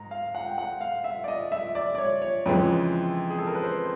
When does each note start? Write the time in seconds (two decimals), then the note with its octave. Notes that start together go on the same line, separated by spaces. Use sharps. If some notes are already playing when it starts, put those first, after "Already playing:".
Already playing: G#2 A#5
0.11 F5
0.35 F#5
0.46 G5
0.58 F#5
0.81 F5
1.04 E5
1.24 D5
1.28 D#5
1.52 E5
1.75 D5
1.95 D5
1.98 C#5
2.22 C#5
2.46 F2 C#3 E3 G#3
3.30 G#4
3.39 A4
3.47 A#4
3.55 B4
3.64 C5